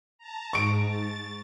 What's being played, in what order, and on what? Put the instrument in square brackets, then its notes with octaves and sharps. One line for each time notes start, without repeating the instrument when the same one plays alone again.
[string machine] A5 A#5
[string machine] G#2 [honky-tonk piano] C#6 D7
[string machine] A6